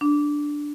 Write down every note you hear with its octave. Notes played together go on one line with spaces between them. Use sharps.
D4